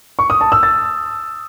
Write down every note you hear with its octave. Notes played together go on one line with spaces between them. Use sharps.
C#6
D#6
A5
E6
A6